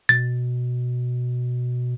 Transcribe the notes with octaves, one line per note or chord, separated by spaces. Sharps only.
B2 A6